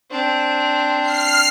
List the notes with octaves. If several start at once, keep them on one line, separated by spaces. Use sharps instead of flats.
C4 D4
F6 C7